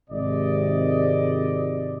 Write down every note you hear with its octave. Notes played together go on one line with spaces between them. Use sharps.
G#1 C3 D5 D#5